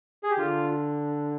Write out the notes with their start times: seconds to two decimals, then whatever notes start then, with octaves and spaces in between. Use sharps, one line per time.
0.23 G#4
0.31 G4
0.38 D3 F4